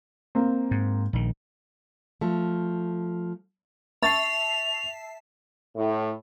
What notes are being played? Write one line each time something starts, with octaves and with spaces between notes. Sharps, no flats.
A#3 C4
G#2
A#1 D#3
F3 A3
E5 A5 C#6 A6 C7 F7
A2